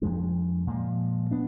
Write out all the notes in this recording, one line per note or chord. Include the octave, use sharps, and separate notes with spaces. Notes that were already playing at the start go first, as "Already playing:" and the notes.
F2 F3 G#3 D4
A#2 F3 G#3
B3 D4